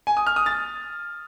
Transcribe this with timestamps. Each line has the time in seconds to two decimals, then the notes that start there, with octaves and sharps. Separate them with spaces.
0.07 G#5
0.17 D#6
0.27 F6
0.36 D#6
0.46 A6